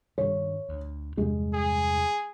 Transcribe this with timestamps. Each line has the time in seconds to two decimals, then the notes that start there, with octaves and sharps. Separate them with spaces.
0.18 G2 D#3 G3 C#5
0.69 D2
1.17 E2 G2 C3 G#3
1.54 G#4